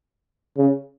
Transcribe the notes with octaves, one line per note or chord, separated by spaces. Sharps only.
C#3